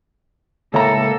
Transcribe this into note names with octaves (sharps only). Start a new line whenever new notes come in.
C#2 A2 A#3 A4 A#5